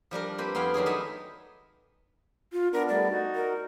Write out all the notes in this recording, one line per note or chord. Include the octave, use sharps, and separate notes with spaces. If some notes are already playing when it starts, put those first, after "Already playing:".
F3 G3 D4 A#4
A#3 C4 G4 B4
F2 B3 E4 F5 G5 B5
D#3 F#3 G4 G#4
G#3 B3 D#4 A4 E5
F4
B3 D4 A#4
G3 A3 B3 D5
D#4 F#4
A#4